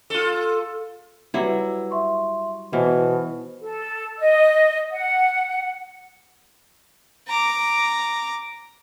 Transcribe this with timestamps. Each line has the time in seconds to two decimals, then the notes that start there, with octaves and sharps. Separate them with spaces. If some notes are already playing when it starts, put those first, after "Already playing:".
0.10 F4 A4
1.34 F#3 G3 E4 B4 F#5
1.91 E5 C6 C#6
2.73 B2 E3 C5 F#5 F6
3.62 A4
4.19 D#5
4.92 F#5
7.28 A#5 D6